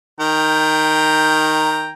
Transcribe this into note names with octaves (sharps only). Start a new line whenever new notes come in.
D#3 G5 A#5